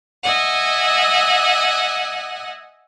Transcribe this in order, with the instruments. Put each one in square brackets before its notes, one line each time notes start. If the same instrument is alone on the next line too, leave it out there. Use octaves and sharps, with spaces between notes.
[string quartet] D#5 E5 F#5 G#5